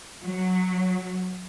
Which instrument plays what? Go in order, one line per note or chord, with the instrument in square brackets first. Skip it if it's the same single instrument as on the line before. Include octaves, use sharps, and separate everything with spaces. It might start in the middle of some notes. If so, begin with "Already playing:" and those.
[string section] F#3